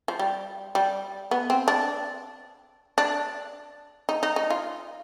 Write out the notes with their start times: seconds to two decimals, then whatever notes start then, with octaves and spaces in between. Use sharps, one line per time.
0.08 F3
0.19 G3
0.75 G3
1.31 B3
1.50 C4
1.68 D4
2.98 D4
4.09 D#4
4.23 D#4
4.36 D#4
4.50 F4